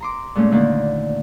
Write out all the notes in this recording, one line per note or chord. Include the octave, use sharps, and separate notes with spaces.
A#5 C6 D6
A#2 G#3 A3 C#4
D3 D#3 A#3